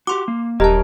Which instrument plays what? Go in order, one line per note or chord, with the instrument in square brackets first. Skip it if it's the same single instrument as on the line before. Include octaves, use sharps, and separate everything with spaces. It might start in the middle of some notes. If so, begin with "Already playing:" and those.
[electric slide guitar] F#4 G4 [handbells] C6 D6
[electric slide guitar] A#3
[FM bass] D#1 [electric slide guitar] F#2 A#4 A#5 [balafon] G4 [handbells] D#5 A5